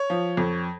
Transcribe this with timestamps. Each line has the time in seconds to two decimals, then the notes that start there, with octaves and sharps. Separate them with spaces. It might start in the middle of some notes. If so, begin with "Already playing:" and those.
Already playing: C#5
0.10 F3
0.37 F2